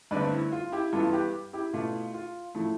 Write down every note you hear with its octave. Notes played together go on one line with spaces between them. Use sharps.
G2 D3 A3 C4 B4 D5
E4
F4
E4 G4
G2 E3 B3 E4 F4 A4
G4 B4
E4 G4
B2 A3 E4 F4
F4
A2 F3 A3 E4